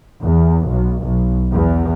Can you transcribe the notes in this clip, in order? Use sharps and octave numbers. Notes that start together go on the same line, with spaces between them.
E2
B1
B1
E2